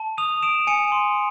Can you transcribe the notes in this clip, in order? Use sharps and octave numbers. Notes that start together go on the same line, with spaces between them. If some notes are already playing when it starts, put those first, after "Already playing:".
Already playing: A5
D#6 D#7 F7
D#6 D7 E7
G#5 C#7 D#7
C6